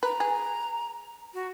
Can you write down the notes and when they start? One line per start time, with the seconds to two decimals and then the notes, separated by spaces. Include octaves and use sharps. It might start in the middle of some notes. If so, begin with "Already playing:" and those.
0.03 B4 A#5
0.20 G#4
1.34 F#4